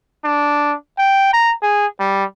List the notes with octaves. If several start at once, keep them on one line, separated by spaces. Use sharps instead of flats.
D4
G5
A#5
G#4
G3